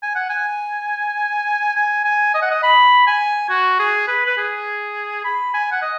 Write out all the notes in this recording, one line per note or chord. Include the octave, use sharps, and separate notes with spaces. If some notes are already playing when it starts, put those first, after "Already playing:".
G#5
F#5
G#5
G#5
G#5
D#5
F#5
D#5
B5
G#5
F#4
G#4
B4
B4
G#4
B5
G#5
F#5
D#5